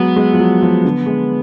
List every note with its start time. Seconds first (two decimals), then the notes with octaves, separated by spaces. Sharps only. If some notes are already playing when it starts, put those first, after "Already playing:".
Already playing: F#3 G#3 B3
0.16 G#3
0.33 F3
0.39 F#3
0.62 F3
0.85 D3
1.06 G#3